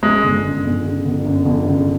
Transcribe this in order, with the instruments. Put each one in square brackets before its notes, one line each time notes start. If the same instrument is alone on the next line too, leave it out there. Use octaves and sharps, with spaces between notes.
[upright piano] C#3 [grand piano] G#3
[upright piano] G1
F#2
G1
C#3
G1
F#2
G1
C#3